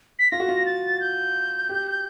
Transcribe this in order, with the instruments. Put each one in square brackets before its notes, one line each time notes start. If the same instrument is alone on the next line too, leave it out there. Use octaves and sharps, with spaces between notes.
[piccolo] B6
[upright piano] F4 [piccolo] A#6
[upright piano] F#4
F4
[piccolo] A6
G6
[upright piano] G4